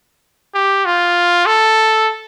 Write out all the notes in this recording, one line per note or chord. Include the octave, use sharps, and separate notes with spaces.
G4
F4
A4